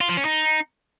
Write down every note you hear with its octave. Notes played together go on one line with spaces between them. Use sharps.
F4
F3
C#4
D#4